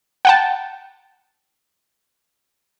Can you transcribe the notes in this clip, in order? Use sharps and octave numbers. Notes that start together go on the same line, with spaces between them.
F#5 G5 A5